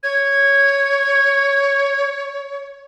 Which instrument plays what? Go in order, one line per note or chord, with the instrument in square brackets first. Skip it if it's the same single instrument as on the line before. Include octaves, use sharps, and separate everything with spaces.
[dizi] C#5 [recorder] G#6